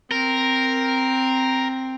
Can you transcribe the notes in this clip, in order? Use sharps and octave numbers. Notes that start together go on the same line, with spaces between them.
C4 A#4